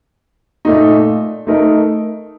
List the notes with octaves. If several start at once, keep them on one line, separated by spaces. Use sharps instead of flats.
A#2 A3 D#4
A3 D#4 A#4